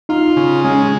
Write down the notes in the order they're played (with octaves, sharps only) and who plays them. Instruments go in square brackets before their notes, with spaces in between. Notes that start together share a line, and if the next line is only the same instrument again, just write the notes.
[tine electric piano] D#4 [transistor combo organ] F4
[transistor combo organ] C#3
[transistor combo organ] G#3 [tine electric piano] C#4